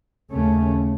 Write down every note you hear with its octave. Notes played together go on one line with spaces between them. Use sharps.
D#2 C#3 A3 C#4